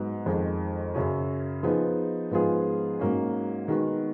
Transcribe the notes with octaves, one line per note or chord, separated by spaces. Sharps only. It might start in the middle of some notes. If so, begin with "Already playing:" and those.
Already playing: G#2 F#3 B3
F2 D#3 G#3 D#4
F#2 C#3 F#3 C#4
F3 B3 D#4 G#4
G#2 F3 B3 F4 G#4
G#2 F#3 A#3 C#4
D#3 G#3 B3 F#4